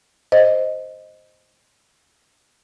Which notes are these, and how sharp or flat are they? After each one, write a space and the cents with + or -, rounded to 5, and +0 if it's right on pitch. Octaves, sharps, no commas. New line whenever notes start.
C5 +0 D#5 +0